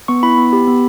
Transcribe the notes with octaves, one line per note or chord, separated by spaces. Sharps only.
B3 C#6
E4 B5
B3
G4
B3